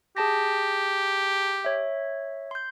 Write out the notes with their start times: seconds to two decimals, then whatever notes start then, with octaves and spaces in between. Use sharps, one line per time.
0.17 G4 G#4 A5 A#6
1.65 C#5 E5
2.51 C6 G6